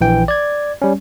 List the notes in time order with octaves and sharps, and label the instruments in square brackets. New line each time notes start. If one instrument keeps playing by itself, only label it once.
[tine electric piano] A#1 E3 G5
D5 G#6
G3 C#4